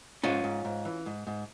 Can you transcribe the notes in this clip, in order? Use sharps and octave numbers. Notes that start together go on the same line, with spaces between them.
G#2 C#4 F4
G#2
G#2
E3
G#2
G#2